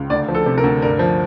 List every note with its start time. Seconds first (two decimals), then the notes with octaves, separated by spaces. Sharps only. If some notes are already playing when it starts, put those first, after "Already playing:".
Already playing: C#2
0.10 D2 D5
0.28 F3
0.35 A4
0.46 C3
0.58 A#4
0.64 D2
0.82 G2 A#4
0.99 F3